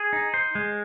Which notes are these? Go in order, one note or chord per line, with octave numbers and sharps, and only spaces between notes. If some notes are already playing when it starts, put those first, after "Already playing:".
Already playing: G#4
D#4
C5
G#3